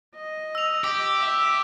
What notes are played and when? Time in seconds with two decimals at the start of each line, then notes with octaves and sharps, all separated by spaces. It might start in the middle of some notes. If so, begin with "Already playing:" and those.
0.16 D#5
0.55 E6 F7
0.84 G4 D6
1.20 E5